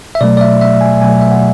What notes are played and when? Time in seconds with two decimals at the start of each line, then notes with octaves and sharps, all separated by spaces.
0.15 E5
0.21 B2 F#3 A3 D5
0.37 D5
0.41 E5
0.61 E5
0.81 G#5
1.01 B2 F#3 A3 G#5
1.21 E5
1.31 F#5